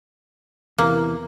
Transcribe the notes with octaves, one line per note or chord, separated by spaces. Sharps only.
E2 C3 E3 A#3